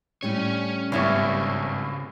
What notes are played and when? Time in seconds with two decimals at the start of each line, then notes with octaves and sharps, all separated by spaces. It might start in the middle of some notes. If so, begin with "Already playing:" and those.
0.23 A2 G3 C#4 D4 C#5
0.92 G#1 G2 C#3 B3 C#4 E4 C#5